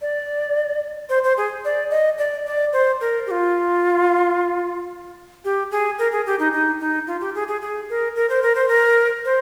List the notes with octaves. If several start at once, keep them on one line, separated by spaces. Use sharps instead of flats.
D5
C5
C5
G#4
D5
D#5
D5
D5
C5
A#4
G4
F4
G4
G#4
A#4
G#4
G4
D#4
D#4
D#4
F4
G4
G#4
G#4
G#4
A#4
A#4
C5
A#4
C5
A#4
C5